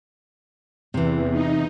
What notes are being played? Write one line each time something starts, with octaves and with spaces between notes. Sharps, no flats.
E2 C3 E3
D#4